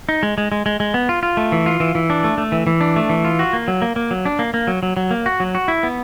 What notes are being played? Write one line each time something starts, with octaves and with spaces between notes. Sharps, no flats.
D#4
G#3
G#3
G#3
G#3
G#3
B3
F4
F4
A3
E3
F4
E3
E3
D4
A3
A3
E3
E3
D4
A3
E3
F4
F#4
A#3
F#3
A#3
A#3
F#3
D4
A#3
A#3
F#3
F#3
F#3
A#3
F#4
F#3
F#4
E4
B3